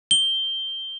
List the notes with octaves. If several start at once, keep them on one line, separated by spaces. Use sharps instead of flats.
G7